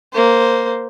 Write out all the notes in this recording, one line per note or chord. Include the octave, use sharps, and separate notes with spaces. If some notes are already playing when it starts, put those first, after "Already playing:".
A#3 C5